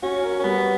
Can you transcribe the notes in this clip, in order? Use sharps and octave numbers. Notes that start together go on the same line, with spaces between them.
C#4 F#4
A#4
C#4
G3 B3